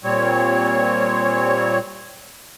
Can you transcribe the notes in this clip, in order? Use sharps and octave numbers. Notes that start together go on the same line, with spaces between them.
A#2 G3 C4 C#5